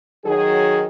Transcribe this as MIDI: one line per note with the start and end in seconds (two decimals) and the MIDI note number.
0.24 0.85 51
0.24 0.85 54
0.24 0.85 68